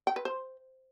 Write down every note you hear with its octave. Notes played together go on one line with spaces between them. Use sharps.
G5
B4
C5